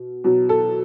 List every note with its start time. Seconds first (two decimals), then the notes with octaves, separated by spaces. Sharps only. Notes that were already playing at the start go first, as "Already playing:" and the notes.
Already playing: B2
0.24 B2 F#3
0.49 A4